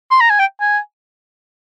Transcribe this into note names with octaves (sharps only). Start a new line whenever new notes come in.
C6
A#5
G#5
G5
G#5